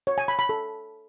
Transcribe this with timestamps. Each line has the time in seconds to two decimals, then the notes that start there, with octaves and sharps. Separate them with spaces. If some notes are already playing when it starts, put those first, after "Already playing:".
0.07 C#5
0.18 G#5
0.28 B5
0.39 B5
0.49 A4